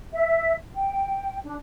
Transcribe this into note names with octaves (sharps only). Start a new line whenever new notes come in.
E5
G5
D4